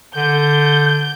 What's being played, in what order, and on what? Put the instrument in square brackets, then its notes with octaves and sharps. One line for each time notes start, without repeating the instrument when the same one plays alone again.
[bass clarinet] D3 [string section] G6